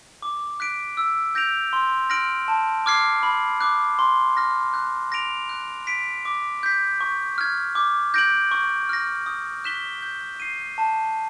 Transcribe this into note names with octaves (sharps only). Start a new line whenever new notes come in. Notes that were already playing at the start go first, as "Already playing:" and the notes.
D6
F#6 B6 D7
E6
G6 A#6 D7 F7
C6
F6 A#6 D7 F#7
A5
D6 F6 G#6 C7
B5
D6 F#6
C6
F6 A#6
F#6
A#6 D7 F7
F#6
B6 D7
D6
G6 B6
C#6
F6 G#6
D6
G6 A#6 D7 F#7
C#6
F6 A#6
D#6
F#6 B6 E7 G7
G6
C7 D#7
A5